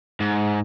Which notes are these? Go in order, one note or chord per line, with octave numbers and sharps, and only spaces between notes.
G#2